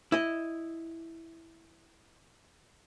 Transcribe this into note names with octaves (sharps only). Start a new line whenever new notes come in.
E4 D#5